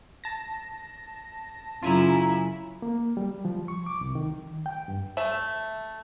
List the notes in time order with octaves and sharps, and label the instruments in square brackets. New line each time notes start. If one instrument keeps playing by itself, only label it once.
[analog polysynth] A5 A#6
[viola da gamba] F#2 C#3 E4 [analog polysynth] F4 G#5 A#5
[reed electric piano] A#3
G3
F3
C#6
D6
C2
D#3
G5
G2
[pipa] A3 E5